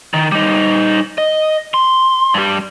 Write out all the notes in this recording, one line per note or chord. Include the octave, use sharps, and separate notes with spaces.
D#3
G3 D#4
D#5
C6
G2 G3